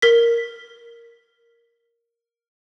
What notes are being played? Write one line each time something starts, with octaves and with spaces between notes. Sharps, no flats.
A#4 B6